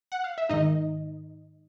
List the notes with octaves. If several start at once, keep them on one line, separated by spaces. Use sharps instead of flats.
F#5
F5
E5
G#2 D#3 D#4 D#5